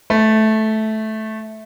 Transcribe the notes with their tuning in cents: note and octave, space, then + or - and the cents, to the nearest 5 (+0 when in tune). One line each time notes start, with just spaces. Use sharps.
A3 -10